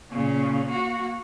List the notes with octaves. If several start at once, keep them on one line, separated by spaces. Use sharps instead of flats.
A#2 C#3
A#3 F#4